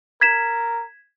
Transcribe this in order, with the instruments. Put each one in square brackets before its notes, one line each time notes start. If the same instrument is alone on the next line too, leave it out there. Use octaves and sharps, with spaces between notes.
[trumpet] A#4 [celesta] G#6 B6 E7